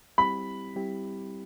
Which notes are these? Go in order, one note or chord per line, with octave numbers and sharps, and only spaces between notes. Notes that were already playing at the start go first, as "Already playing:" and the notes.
G3 C4 E4 G4 B5
G3 C4 E4 G4